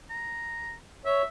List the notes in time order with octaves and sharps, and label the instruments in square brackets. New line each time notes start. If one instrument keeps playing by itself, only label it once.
[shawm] A#5
[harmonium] C#5 [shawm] E5